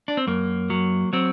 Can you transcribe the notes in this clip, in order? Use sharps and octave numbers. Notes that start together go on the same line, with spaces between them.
D4
C4
F#2 A#3
F#3
F#3 C4